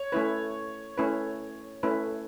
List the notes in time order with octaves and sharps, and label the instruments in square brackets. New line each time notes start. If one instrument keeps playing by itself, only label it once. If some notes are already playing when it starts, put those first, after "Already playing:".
Already playing: [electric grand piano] C#5
[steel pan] A3 C#4 E4 B4
A3 C#4 E4 B4
A3 C#4 E4 B4